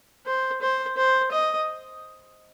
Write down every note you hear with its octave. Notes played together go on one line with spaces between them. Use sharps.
C5
C5
C5
D#5